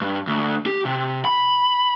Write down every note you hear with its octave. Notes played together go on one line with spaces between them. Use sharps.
G2
D2
G4
C3
B5